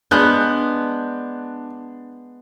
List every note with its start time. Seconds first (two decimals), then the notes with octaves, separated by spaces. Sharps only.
0.11 G#3 B3 D4 F#6 G6